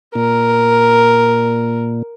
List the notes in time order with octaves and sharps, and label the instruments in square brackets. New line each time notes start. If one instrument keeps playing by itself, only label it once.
[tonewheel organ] A#2 [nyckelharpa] A#4